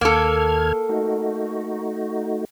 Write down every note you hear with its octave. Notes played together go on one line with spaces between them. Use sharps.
D#2 A#3 A4 F6 G#6
A3 D#4 F#4